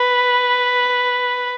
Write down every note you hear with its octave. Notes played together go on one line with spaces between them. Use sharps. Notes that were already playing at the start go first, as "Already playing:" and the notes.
Already playing: B4